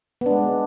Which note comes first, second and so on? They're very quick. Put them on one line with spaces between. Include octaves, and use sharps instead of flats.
B3 D4 G#3